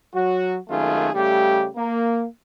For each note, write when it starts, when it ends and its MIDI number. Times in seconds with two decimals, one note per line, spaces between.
0.14 0.57 54
0.14 0.57 66
0.69 1.09 32
0.69 1.09 42
0.69 1.09 51
0.69 1.09 57
0.69 1.09 65
0.69 1.09 68
1.14 1.67 49
1.14 1.67 55
1.14 1.67 57
1.14 1.67 67
1.77 2.25 58